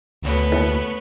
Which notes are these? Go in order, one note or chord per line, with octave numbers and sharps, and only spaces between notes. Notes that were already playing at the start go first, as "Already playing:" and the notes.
D2 A3 B3 C#4
D#2